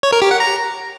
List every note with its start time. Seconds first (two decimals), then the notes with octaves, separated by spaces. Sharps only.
0.03 C#5
0.12 A#4
0.22 G4
0.31 F#5
0.40 A#5